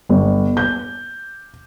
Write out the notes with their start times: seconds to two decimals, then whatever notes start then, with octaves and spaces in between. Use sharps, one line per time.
0.09 G1
0.57 G6